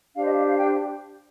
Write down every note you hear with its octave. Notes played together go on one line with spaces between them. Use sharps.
D4 G4 C5 F5
D#5
F5
F5
G5